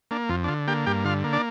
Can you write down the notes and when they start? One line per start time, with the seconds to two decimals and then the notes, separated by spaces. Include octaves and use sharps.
0.11 A#3 D4
0.29 F2 F4
0.44 D4
0.48 D3 F4
0.68 A#3 G4 G5
0.86 G2 G4 G5
1.04 D3 F4 F5
1.24 A#3
1.33 D4 D5